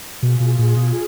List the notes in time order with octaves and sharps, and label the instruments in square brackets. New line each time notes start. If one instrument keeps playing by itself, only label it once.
[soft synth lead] B2 [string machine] F4 G#4
[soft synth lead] B2
A#2
B2